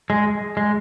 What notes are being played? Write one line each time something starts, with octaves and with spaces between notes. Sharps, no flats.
G#3
G#3